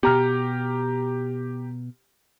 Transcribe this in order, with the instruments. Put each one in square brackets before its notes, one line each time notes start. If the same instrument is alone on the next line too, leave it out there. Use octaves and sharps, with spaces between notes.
[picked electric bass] B2 B3 [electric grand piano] G4 A#5 F6